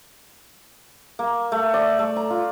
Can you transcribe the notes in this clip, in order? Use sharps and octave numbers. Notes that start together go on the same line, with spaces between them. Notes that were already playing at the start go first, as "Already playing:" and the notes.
A#3
A3
D5
A3
A#5
F4